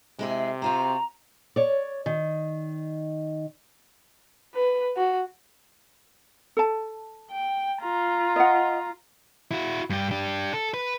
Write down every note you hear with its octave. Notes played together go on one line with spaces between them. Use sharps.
C3 G#3 E4 G#4
C4 F4 F#4 A#5
C#5 D5
D#3
B4
F#4
A4 A5
G5
F4 A#5
D#5 F#5
E4 F#4
G2 G4
D4 G4
A4
B4